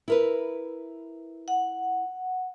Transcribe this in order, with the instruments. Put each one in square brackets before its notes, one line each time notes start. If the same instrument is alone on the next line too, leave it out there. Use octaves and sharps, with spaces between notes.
[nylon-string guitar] E4 A#4 B4
[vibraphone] F#5